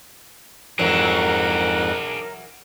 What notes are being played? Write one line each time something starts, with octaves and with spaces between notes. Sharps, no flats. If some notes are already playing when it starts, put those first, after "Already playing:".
F2 G#2 E3 F#3 D4 G#4 A#4 F#6